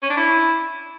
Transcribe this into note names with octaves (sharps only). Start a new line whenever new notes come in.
C#4
D4
E4